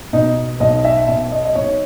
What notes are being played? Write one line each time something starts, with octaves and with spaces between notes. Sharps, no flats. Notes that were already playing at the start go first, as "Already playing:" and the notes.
B2 D#4
B1 D#5
E5
B2 E5
D#5
D#5
B1 C#5